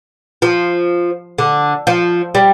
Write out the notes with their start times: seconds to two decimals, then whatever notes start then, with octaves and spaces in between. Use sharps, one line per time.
0.42 F3
1.38 D3
1.87 F3
2.35 G3